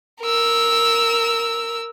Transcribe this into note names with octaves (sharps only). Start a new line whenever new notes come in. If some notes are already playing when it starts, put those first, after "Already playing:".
A#4 E6